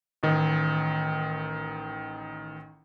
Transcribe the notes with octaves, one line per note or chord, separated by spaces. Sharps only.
A1 D#3